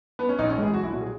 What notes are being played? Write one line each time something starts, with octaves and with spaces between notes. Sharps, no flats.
B3
C#4
A#1 D#4
C#4
G#2 E3 G#3
G#4
B1 F#4
E4
A#2 F#3 F#4
G#4